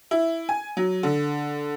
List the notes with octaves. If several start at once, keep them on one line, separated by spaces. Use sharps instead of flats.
E4
G#5
F#3
D3